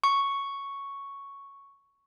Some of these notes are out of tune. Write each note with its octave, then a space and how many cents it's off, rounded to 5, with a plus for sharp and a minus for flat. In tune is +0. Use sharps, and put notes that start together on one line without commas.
C#6 +0